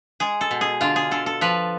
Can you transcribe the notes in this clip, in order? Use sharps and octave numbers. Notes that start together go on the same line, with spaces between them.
G#3 G#4
A4
B2
G#4
D3 F4
G#4
D3 A4
A4
F3 B4